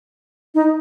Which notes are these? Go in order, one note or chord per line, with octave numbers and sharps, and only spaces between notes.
D#4